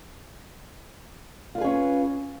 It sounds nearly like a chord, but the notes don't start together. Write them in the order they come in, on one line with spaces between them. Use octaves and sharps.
F4 B4 G#4 C#4